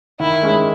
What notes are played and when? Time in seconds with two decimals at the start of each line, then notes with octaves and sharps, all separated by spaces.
0.20 D#3 E4
0.43 G#3 C#4 G#4